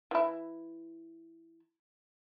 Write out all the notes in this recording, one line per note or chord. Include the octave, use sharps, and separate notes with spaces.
E3 E4